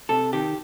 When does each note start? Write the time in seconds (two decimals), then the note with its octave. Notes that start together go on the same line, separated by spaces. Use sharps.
0.09 C3 A4
0.33 D#3 G4